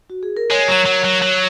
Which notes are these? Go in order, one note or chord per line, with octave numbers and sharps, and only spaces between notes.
F#4
G#4
A#4
G#3 C#5
F#3
F#3
F#3
F#3 C#5